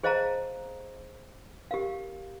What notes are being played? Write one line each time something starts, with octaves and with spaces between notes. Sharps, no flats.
G#4 C5 D#5 F5 A5 A#5
G4 A#4 F5